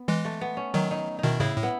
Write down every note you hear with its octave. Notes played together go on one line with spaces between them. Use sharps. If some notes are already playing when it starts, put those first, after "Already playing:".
Already playing: B3
E3 G#3
A3
B3
C#4
D#3 F#3 D#4
D#4
B2 D#3 D#4 E4
A2 C#3 E4
A2
B3